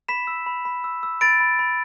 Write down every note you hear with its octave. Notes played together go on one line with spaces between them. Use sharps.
B5 B6 E7
E6
B5
B5
E6
E6
B5 A6 D7
B5
B5